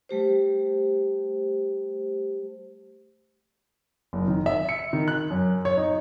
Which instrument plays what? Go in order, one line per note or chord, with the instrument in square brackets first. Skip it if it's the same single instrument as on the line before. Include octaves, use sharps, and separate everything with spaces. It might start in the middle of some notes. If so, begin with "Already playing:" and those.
[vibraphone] G3 A3 G4 C5
[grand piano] F#1
D#3
E5
C#7
D#3
F#6
F#2
C#5
D#4